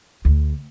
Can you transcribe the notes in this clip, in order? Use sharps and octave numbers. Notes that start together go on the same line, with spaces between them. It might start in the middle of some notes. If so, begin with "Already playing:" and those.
D2